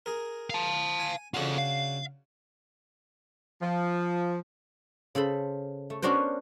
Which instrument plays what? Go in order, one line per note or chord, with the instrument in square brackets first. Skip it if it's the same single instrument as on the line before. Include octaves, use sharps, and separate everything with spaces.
[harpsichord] G#4 A#4
[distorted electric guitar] F5 A5
[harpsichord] G#5
[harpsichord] C#3 D4 F#4 [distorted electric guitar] F4 A4
[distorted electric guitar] F5
[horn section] F3
[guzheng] C#3 A4 C5 B5
A3
B3 C#4 D4 F#4 A#4 C5